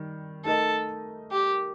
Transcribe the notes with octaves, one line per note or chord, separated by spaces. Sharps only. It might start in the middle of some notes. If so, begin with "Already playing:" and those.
Already playing: D#3 G3
A3 D#4 A4 A#4 D#5
G4